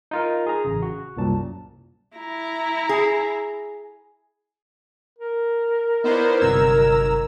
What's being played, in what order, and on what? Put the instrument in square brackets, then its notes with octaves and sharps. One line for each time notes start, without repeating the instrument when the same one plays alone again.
[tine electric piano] D#4 F4 A#4
G#4 A#5
A1 C#3
F#4
C2 F#2 A#2 A5
[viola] E4 A#5
[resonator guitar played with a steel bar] G#4
[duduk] A#4
[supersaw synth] B3 C5 [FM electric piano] D#4 [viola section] E4 D5
[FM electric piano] G1 C3 G#6 [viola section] D#3 F#3 A#5 [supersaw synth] E6